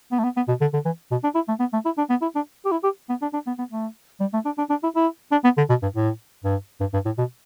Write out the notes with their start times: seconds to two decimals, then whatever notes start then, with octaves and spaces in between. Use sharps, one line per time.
0.12 B3
0.19 A3
0.24 B3
0.37 B3
0.48 B2
0.61 D3
0.73 D3
0.85 E3
1.11 B2
1.24 D4
1.35 E4
1.48 A3
1.60 B3
1.73 A3
1.85 E4
1.98 D4
2.10 B3
2.22 E4
2.35 D4
2.65 G4
2.71 E4
2.84 G4
3.09 B3
3.22 D4
3.33 D4
3.47 B3
3.59 B3
3.71 A3
4.20 G3
4.34 A3
4.45 D4
4.58 D4
4.70 D4
4.83 E4
4.96 E4
5.32 D4
5.44 B3
5.58 D3
5.69 B2
5.82 G2
5.94 A2
6.44 G2
6.80 G2
6.93 G2
7.05 A2
7.18 B2